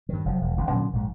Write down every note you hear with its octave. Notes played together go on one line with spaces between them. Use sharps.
G2 D#3
F1 F3 F#3
E1
D#1 D2 A#2 C#3
A#2 D3 F#3 C#4
A#1 G#2